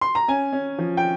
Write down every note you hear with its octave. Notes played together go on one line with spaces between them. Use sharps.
C6
A#5
C#4 G#5
C#4
F3
G5